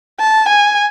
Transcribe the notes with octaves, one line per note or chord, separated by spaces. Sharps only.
A5
G#5